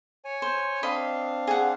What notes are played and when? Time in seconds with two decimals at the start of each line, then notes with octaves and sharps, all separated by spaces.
0.25 C#5 G#5
0.42 C5
0.83 C4 D4 D#5 F5 B5
1.47 G#4 F#5